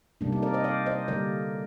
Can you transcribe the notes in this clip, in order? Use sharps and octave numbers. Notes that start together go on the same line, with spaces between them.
C3 G3 A#3 D4
C4 D#4
A#4 D5
C5 D#5
D5 F5
C5 D#5
D3 G3 A#3 A#4 D5